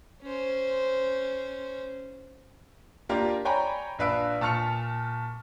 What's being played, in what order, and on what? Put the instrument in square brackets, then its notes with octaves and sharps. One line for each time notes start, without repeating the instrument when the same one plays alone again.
[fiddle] C#4 C5
[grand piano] A#3 D4 F4 G4 A#4
C#5 D5 G5 G#5 A#5 B5
A#1 D4 B4 F5 E6 D7
A#2 A5 C#6 F6 C#7 F7